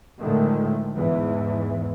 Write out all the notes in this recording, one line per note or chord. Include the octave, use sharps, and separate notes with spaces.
A2 D3 D#3 F3 G#3 A3
E2 G#2 E3